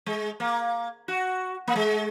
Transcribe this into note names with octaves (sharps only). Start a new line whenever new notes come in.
G#3
A#3
F#4
A#3
G#3